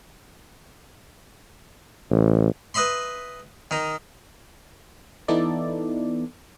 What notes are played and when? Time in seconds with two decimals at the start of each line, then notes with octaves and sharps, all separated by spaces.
2.10 A1
2.74 B4 D#5 E5 B5 C6
3.71 D#3 D#4
5.28 E3 B3 D#4 E4 A4 D5